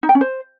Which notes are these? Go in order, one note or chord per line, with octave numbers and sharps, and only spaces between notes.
D#4
G5
C#4
C5